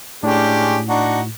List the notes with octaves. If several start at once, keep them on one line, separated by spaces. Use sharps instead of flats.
A2 G#3 C#4 D4 G4
D4 D#4 F#4